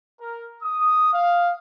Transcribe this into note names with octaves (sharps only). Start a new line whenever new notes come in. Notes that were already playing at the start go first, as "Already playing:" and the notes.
A#4
D#6
F5